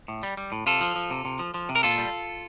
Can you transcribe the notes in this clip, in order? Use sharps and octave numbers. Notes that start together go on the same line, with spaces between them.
A2
G3
G3
A2
C3 F4 A4
F3
F3
C3
C3
F3
F3
C3
A#4
A#2 F4 A4
G3